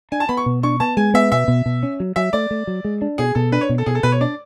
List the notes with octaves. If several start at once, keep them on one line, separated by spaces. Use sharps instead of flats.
D4 G#5
A5
B3 B5
C#6
B2
D4 C#6
B3 A5
G#3 G#5
B3 E5
B2 E5
B2
B2
C#4
F#3
F#3 E5
A3 D5
A3
F#3
G#3
D4
B2 G#4
B2 A4
D4 B4
C#5
B2
A4
B2 G#4
A4
B2 B4
C#5
D4 D5